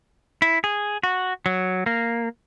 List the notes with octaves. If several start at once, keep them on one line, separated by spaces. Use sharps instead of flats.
E4
G#4
F#4
F#3
A#3